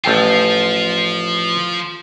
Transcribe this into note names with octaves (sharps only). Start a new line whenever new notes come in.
A1 F3 F4 A4 G5